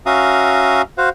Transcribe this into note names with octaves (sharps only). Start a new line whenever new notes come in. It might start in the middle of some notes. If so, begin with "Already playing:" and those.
C#4 F#4 E5 F5 A#5 D#6
F#4 C5 F5 F#5